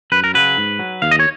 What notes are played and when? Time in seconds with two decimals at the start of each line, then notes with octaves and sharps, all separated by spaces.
0.12 F#2 B4
0.24 A#4
0.34 C#3 F#3 B4
0.57 G#2
0.79 F#3
1.02 D#2 F5
1.11 D#5
1.20 C#5